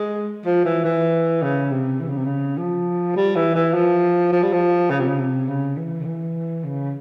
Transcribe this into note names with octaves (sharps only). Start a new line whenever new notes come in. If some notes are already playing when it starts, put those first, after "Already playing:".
Already playing: G#3
F3
E3
E3
C#3
C3
E3
C#3
C3
C#3
F3
G3
E3
E3
F3
F3
G3
F3
C#3
C3
C#3
C3
C#3
E3
C#3
E3
C#3